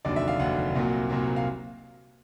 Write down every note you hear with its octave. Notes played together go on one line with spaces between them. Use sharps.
F1 D#2 D3 F#3 D5
E5
F5
F1 D#2 D3 F#3 F#5
C2 A#2 F#3 A#3
C2 A#2 F#3 A#3
F5